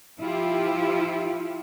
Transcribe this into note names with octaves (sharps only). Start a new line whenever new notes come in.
F3 E4 F4 G4